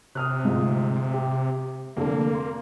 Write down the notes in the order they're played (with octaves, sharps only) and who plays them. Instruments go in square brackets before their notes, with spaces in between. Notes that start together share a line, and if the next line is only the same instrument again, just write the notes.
[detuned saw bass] C3 [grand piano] D#6 F6 F#6
[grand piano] D1 G#2 F4
G4 E5
[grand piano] F1 D3 A4 [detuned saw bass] A#3
[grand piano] C6